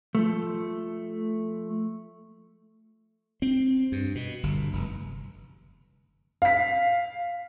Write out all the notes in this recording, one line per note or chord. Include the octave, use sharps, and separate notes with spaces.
F3 A3
C4
G2
B2
G1
F1
F5 B6